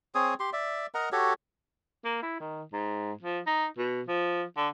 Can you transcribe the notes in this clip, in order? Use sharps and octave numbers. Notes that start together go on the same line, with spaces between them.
C4 G#4 C#5 D#6
G4 C6
D5 E5
A#4 D#5 F#5 A#5
F#4 G4 A4 C#5
A#3
E4
D#3
G#2
F3
D#4
B2
F3
D3